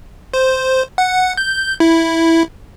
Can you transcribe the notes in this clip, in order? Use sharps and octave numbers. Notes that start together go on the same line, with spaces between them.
C5
F#5
G6
E4